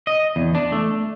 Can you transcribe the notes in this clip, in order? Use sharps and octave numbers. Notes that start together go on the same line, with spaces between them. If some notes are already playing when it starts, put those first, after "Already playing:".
D#5
E2
D4
A3